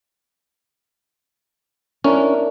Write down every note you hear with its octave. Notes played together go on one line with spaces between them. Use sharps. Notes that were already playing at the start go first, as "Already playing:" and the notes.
C#4 D4 E4 A#4